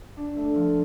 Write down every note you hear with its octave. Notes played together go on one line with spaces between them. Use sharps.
D4
A3
F3